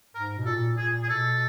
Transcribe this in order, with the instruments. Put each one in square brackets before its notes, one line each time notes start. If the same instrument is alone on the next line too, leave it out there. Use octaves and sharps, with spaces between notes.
[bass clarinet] G#2 [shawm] A#4
[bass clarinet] B2
[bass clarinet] A#2 [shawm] A4
[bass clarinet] A#2 [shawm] G#4
[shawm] G#4
[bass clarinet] B2 [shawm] A4